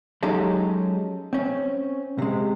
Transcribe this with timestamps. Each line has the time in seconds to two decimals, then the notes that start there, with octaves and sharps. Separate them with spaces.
0.23 F#3 G#3 C#4 D#4 G4 A4
1.33 C4 C#4
2.18 C3 G#3